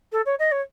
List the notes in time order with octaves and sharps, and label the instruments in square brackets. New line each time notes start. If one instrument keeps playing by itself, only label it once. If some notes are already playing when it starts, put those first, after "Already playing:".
[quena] A4
C#5
D#5
C#5